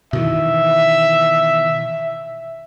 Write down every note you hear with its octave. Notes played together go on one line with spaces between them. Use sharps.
B2 D#3 E3 E5